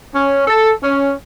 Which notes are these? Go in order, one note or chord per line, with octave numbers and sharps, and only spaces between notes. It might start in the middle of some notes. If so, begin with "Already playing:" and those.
C#4
A4
C#4